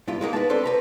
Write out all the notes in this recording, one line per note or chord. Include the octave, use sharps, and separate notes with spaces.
G2 E4 F4
G#3 A#3 B3 D#4
B4 A5
C4 D4 A4 B4 C5
B4 A#5 B5